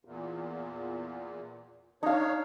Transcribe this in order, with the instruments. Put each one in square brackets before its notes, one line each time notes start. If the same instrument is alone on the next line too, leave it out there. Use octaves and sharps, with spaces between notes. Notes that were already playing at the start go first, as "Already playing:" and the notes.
[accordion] E2 A#2
[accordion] D4 C#5 [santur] D#4 F5